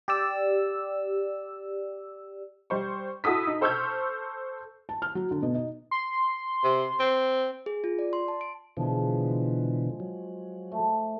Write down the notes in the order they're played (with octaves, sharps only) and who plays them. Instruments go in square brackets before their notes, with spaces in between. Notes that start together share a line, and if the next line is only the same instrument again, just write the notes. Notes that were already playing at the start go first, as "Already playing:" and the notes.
[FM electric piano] G4 D5 E6
[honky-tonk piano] G3 C5 C#6
E4 F#4 A4 D#6 B6
D#4
A4 C5 C#6 E6 F6 G6
[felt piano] A5
F6
F#3
D3
B2
D#4
[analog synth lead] C6
[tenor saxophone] C3
C4
[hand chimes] G#4
F4
D5
C6
A5
D7
[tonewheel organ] B2 D3 E3 [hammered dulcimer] F3 G#3
[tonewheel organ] F#3
[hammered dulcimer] A3